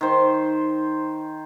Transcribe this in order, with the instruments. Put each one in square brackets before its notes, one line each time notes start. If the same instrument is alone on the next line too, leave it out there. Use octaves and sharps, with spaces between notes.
[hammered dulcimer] D#3 C5